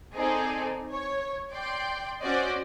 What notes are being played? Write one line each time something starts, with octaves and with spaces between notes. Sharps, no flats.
C4 D#4 G#4 A4 D5
C#5
D5 G5 C6
C#4 F#4 C5 D5 D#5 F#5